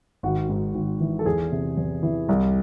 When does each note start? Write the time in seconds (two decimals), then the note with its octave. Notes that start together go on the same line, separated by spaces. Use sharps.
0.23 G#1 F#4
0.49 G#2
0.74 G#1
1.00 E3
1.19 A4
1.26 E2 G#4
1.52 C3
1.77 E2
2.03 E3
2.29 C2